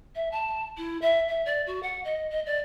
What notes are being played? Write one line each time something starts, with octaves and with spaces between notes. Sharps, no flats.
E5
A5
E4
E5
E5
D5
F#4
F#5
D#5
D#5
D5